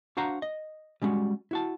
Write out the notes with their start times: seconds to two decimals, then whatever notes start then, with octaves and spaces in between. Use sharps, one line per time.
0.17 D4 F#4 C5 F5 F#5 A#5
0.42 D#5
1.02 G3 G#3 C#4 D#4 F#4
1.51 E4 F#4 A5